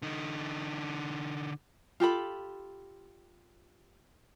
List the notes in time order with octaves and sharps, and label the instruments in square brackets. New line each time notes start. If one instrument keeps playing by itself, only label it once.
[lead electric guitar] D3 D#4
[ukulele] F4 G4 A4 B5